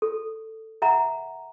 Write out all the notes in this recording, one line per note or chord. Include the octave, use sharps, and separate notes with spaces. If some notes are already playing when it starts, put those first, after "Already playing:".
A4
E5 F#5 A#5